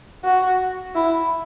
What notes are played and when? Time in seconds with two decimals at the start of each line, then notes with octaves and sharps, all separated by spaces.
0.24 F#4
0.95 E4